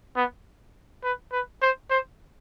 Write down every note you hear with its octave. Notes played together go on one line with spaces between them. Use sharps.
B3
B4
B4
C5
C5